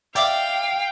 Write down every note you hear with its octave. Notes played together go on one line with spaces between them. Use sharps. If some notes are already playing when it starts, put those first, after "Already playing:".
D5 E5 F5 G5 D6